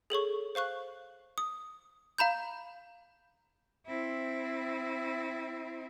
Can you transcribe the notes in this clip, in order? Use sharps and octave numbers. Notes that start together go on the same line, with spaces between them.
G#4 A4 C#5 C#6
C5 F5 C#6 F#6
D#6
F5 A#5 B5 G6
C4 E4